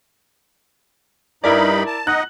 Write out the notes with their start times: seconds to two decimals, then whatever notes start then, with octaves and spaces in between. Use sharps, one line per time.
1.44 G2 D#4 E4 A#4 D5 B5
1.87 A5
2.07 D#4 D#5 F#5 F#6